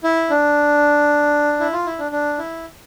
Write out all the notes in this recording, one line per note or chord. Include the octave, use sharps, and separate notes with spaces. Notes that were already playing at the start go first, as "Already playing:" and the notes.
E4
D4
E4
F4
E4
D4
D4
E4